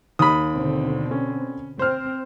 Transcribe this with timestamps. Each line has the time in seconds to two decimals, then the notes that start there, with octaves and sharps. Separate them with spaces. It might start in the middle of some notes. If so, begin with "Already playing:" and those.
0.19 D#2 B5 D#6
0.55 B2 D3 C4
1.11 C#4
1.79 C4 C5 F6